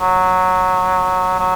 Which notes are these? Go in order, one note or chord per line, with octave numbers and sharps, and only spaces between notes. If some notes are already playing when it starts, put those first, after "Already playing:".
F#3
F#3